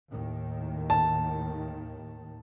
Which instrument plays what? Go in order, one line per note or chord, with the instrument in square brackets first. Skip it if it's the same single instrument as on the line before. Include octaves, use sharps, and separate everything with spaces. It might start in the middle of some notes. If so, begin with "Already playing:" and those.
[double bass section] D#2 A2 D#3
[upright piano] A5